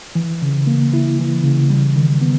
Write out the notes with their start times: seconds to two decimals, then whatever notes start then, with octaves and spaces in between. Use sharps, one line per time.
0.15 E3
0.42 C#3
0.67 A#3
0.93 E4
1.19 E3
1.44 C#3
1.70 G3
1.96 D#3
2.21 B3